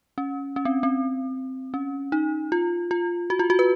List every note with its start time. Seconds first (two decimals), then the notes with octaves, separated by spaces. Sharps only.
0.18 C#4
0.56 C#4
0.65 C4
0.83 C4
1.74 C#4
2.12 D#4
2.52 F4
2.91 F4
3.30 F#4
3.39 F4
3.50 F#4
3.59 B4